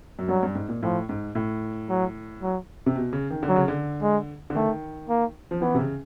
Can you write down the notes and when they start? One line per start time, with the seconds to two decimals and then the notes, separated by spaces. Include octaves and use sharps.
0.19 F#2
0.28 G2 F#3
0.43 G2
0.55 G#2
0.69 A#2
0.82 A2 F3
1.09 G#2
1.35 A2
1.89 F#3
2.42 F#3
2.86 C3
2.96 B2
3.13 C#3
3.30 D#3
3.43 D3
3.49 F#3
3.56 C#3
3.68 D3
4.02 G#3
4.50 D3
4.55 D#3 A3
5.09 A#3
5.51 F3
5.61 E3 B3
5.75 C3
5.79 C#3